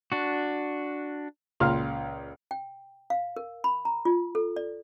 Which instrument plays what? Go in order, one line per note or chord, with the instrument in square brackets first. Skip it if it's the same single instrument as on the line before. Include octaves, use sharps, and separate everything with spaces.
[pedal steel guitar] D4 F#4
[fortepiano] C#2 A#2 F5 C6 F6
[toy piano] G5
F5
A#4
B5
A#5
F4
A4
D5